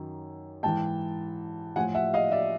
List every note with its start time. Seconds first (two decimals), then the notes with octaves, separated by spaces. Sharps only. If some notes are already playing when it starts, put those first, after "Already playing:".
Already playing: F#2 D#3
0.63 G#2 E3 G5 A5
1.76 A2 F3 F#5 G#5
1.95 E5 F#5
2.14 D#5 F5
2.32 D5 E5